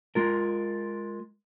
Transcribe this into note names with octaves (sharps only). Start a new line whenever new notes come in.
G#3 F4 A#4